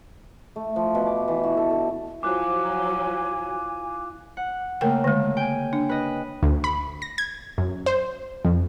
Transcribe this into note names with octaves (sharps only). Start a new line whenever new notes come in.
A3
F3
B2
D6
E3
F#4
A4
D3
F3 F#3 E4 F4 F5 G#5 D6 F#6
F#5
C#3 A3 A#3 A#4 G5
D3 G#3
G5 G#5
D4
B4 D#5
D2
B5
A#6
G#6
F#2
C5
F2